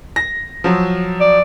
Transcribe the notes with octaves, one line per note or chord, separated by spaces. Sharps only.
A#6
F3 F#3
D5